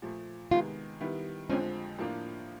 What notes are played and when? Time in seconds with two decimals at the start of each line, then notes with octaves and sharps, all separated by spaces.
0.02 A#2 F3 A3
0.51 C3 D#3 G#3 B3 F4
1.01 D#3 G3 B3 E4
1.49 F2 D3 F3 G#3 C4 C#4
1.98 A2 F3 A#3 D4 F4